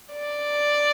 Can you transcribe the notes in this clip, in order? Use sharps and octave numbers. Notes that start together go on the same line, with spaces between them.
D5